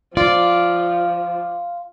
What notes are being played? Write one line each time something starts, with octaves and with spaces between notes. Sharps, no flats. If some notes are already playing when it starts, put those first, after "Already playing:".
F3 F4 D5